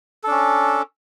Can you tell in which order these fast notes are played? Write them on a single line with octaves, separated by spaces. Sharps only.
A4 D4 C#4